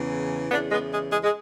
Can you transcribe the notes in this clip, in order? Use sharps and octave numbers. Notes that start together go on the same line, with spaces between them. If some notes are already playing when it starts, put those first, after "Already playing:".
Already playing: E2 C#3 E3
E2 C#3 E3 B3 D4
G#3 B3
G#3
G#3
G#3